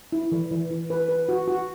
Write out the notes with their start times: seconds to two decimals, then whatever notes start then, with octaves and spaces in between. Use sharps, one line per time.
0.12 E4
0.32 E3
0.51 E3
0.70 E3
0.90 B4
1.09 B4
1.29 F#4
1.48 F#4